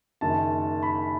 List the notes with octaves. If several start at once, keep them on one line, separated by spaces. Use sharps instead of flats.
F#1 F#2 D#3 A5
B5